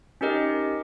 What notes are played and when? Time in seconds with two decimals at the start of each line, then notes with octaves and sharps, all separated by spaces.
0.21 C#4 D#4 G4 A#4 D#5